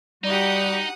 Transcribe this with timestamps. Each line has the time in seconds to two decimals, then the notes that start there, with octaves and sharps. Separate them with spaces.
0.24 G3 D#4 F#4 G4 F#5 D#6